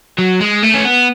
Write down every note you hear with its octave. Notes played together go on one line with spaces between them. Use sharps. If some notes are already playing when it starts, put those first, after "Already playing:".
F#3
G#3
A3
C#4
B3